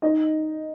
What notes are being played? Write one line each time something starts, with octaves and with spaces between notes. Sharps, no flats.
D#4 D#5